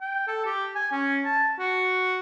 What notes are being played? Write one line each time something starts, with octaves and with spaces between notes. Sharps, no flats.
G5
A4
G4
G#5
C#4
A5
F#4